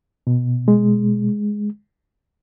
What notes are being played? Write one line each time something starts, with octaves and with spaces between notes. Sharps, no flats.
B2
G#3